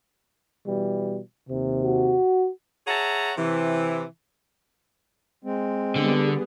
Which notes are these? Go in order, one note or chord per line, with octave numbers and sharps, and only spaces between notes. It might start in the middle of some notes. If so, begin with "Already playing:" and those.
B2 E3 G3
D#2 C3
F#4
G#4 C#5 E5 F#5 A5 A#5
C3 E3
G#3 C4
D3 G3 B3 G#4